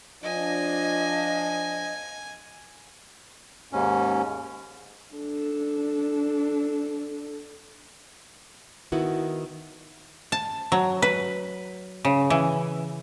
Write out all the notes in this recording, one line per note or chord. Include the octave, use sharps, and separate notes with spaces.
F3 D4 D#5 G#5
D#2 G#2 C#4
D4 A4
D#3 B3 E4 F#4
A5
F#3
B4
C#3
E3